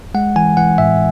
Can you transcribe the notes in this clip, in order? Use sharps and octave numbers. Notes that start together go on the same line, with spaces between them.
G#3 F#5
E3 G#5
E3 F#5
A2 E5